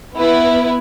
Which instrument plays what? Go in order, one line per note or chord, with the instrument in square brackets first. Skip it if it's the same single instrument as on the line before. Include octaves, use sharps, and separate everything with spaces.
[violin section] B3 E4 B4